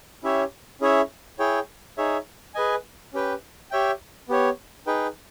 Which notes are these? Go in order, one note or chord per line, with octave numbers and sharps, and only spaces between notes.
C#4 E4 G4 C#5 E5
C#4 E4 G#4 C#5 E5
E4 G#4 C#5 G5
D#4 G#4 C#5 E5
G#4 B4 D#5 G#5
C#4 G4 B4 G5
G4 C#5 E5 G5
B3 G4 C#5
D#4 G#4 B4 G5